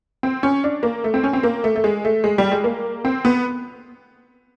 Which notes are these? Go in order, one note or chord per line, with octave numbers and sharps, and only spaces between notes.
C4
C#4
D4
A#3
A3
C4
C#4
C4
A#3
A3
A3
G#3
A3
G#3
G3
G#3
A#3
C4
B3